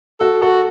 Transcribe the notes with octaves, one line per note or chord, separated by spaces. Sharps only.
F#4 A4
F#4 A4